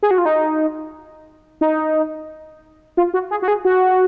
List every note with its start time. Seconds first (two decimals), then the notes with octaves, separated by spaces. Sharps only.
0.03 G#4
0.11 F#4
0.18 F4
0.26 D#4
1.61 D#4
2.97 F4
3.14 F#4
3.31 G#4
3.42 F#4
3.48 G#4
3.65 F#4